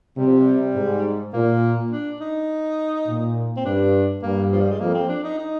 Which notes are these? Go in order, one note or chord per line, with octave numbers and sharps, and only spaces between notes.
C3 G3
F3
G3
G#2
A#2 A#3
D4
D#4
A#2
C4
G2 D4
G2 A#3
F3
G3
G#3
F2 A#3
C4
D4
D#4
D#4